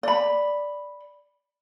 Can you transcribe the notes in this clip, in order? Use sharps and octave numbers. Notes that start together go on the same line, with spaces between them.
D5 B5